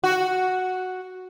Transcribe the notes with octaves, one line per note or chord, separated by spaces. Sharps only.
F#4